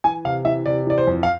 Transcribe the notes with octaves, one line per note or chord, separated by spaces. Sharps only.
E3 G#5
C3 F5
E3 E5
C3 D5
E3 D5
C5
F2
F5